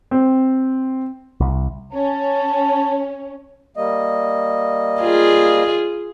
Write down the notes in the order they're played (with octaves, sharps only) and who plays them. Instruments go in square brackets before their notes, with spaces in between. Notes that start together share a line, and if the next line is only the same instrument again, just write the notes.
[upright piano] C4
[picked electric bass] C2
[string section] C#4 [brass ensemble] A5
[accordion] G3 A#3 D#5
[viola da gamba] F4 G#4